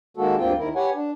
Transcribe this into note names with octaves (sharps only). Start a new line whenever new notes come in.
D#3 G#3 A#3 F#4 A4
D2 G2 A#3 C4 F4 G5
D#2 D#3 E4 A#4
G4 B4 C#5 F#5 G#5
D4